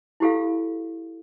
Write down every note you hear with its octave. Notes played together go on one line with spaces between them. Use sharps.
E4 F#4 G4 A4 F5